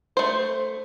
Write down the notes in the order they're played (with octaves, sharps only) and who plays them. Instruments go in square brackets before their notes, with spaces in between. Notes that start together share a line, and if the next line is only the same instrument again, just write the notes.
[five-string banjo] A3 C5